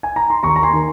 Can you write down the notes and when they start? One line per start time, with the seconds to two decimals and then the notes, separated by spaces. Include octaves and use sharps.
0.03 G#5
0.16 A#5
0.30 C6
0.43 D#2 A#5 C#6
0.56 A#5
0.63 G#5 C6
0.73 D#3